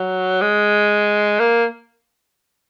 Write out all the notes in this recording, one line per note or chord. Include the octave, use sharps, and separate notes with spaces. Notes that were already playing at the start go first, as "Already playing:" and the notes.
Already playing: F#3
G#3
A#3